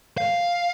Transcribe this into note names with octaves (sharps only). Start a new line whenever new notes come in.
F5